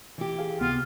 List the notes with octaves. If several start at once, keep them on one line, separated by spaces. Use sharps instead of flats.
E3 G4
G#4 F5
C#2 C3 B3 F4 C6